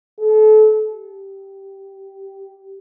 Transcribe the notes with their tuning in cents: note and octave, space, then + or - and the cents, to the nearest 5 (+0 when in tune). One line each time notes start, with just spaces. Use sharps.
A4 -30
G4 -10